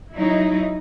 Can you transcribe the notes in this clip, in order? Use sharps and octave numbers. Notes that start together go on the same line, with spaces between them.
F#3 D#4 E4